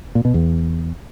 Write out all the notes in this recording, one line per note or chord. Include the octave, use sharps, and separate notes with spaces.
A#2
B2
E2